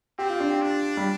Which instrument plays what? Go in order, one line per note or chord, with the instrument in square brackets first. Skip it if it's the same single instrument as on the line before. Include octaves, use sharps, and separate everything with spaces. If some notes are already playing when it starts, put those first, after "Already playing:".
[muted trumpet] C4 [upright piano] G4
[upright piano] F4
D4
G4
[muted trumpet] D4
[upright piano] G3